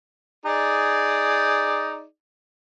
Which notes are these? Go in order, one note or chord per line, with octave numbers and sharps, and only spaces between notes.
D#4 G#4 D5